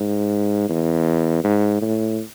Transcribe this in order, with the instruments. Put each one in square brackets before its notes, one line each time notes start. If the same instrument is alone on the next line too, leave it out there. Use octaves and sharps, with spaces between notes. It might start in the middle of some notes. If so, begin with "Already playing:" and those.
Already playing: [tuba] G#2
E2
G#2
A2